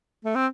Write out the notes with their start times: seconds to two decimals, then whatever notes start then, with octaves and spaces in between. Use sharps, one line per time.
0.25 A3
0.35 C4